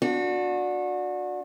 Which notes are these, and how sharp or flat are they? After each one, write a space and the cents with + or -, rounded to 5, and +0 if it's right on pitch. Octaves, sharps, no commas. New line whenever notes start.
D4 +0 F#4 -30